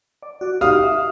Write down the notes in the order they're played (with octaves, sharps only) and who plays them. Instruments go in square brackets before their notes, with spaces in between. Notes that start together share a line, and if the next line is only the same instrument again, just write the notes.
[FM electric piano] D5
F#4 D5
[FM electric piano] D#4 F#4 G4 [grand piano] F5 D#6 F6
[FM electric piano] E5